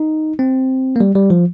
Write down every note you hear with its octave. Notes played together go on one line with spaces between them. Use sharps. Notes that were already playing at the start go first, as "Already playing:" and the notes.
Already playing: D#4
C4
A#3
G3
G3
F3